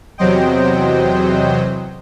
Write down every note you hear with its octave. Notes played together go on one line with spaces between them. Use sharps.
E2 C3 F#3 C5 D#5 G5